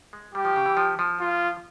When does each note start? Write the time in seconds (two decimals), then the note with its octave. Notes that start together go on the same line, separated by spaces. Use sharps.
0.13 G#3
0.34 G3 G4
0.45 F3
0.56 C#3
0.66 E3
0.77 F3
0.99 F3
1.20 F4